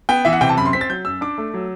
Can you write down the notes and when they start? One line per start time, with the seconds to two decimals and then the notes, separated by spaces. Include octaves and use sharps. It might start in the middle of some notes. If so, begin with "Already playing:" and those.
0.09 B3 G5
0.25 E3 E5
0.33 F#5
0.41 C3 G5
0.49 A5
0.57 F#2 B5
0.65 C6
0.73 C4 B6
0.81 A6
0.90 F#3 G6
1.05 F#2 E6
1.21 D4 D6
1.38 A3
1.54 F#3